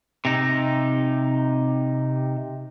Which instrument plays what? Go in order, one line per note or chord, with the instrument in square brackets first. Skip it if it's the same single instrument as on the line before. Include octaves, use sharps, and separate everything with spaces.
[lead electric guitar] C3 D#4